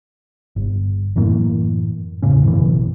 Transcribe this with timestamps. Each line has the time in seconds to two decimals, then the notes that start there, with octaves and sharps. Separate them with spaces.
0.56 G1
1.16 F#2 A2 E3 A#3
2.22 E1 A2 C#3 C#4
2.43 A1 F#2 B2 E3